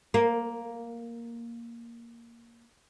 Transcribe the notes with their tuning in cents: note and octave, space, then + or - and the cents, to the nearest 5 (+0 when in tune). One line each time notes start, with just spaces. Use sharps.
A#3 +5